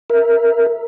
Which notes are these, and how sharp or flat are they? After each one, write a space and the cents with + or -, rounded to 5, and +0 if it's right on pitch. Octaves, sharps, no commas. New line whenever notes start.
A#4 +0 E5 +0